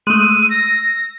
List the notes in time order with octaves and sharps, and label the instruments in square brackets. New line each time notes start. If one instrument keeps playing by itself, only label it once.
[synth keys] G#3 A3 [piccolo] D#7
[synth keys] E6
[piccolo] A#6